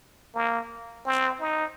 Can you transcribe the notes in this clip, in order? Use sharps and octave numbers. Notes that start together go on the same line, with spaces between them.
A#3
C4
D#4